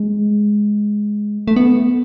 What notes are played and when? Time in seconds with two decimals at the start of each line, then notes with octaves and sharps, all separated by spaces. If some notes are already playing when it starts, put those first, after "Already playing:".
Already playing: G#3
1.48 A3
1.56 B3